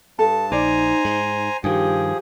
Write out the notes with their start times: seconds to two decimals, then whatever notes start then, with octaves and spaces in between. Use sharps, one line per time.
0.19 G2 A4 A5
0.52 A#1 D#4 C5 D5 G#5 A#5
1.05 G#2
1.64 G2 D#3 F3 G4 G#4